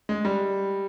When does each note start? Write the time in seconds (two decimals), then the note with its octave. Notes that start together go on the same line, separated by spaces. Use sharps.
0.09 G#3
0.25 G3